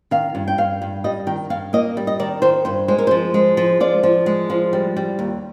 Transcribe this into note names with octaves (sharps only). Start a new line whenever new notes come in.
D#3 F5
G2
G5
G2 F5
G2
G3 D#5
D#3 G5
G2 F5
A#3 D#5
G3
D#5
D#3 D5
D#3 C5
G2 C5
G#3 C5
A#4
F3 C5
G#3
F3
F3 D5
F3
G#3
F3
G3
G3
D#2